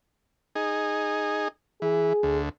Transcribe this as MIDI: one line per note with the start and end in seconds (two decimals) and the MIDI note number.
0.55 1.48 63
0.55 1.48 68
1.82 2.13 52
1.82 2.39 68
2.23 2.49 38